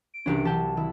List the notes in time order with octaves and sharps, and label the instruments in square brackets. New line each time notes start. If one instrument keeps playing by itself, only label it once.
[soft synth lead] D7
[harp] C2 E3 [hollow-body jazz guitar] C#4 D4 G4
[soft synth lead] E3 [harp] F#3 A5 [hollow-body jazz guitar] G4 G5
[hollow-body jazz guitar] D#3 [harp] E4